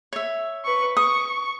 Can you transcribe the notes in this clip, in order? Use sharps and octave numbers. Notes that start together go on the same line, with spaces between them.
C#5 E5
B4 C#6
C#6 D#6